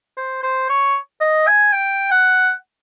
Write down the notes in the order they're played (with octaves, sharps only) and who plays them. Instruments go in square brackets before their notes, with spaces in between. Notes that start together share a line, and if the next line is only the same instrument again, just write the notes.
[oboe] C5
C5
C#5
D#5
G#5
G5
F#5